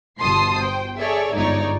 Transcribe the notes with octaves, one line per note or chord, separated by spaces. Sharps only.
G1 B2 A5 C6 D#6 C7
C5 G5
G#4 A4 C#5 D5 E5
G1 G#2 D#4 C#5 D5